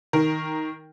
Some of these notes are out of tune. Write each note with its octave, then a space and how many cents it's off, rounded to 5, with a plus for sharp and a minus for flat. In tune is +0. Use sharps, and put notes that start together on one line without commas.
D#3 +15 A#4 +0